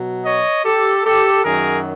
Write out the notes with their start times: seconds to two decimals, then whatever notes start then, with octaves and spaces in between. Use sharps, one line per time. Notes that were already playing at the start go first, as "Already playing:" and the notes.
Already playing: B2 F#3
0.25 C#5 D#5
0.65 G4 A4
1.05 G4 A4
1.45 F#2 D#3 F#3 G#4 A#4